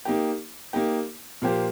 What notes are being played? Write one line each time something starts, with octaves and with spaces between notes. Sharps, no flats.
A#3 D#4 G4
A#3 D#4 G4
A#2 F3 A#3 G4 C5